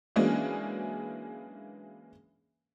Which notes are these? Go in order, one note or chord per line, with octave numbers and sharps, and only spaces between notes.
E3 F#3 G#3 A#3 C#4 D4